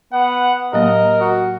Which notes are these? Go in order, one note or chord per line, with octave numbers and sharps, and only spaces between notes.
B3 F#5
A2 F#3 A#3 A#4 D#5
F#4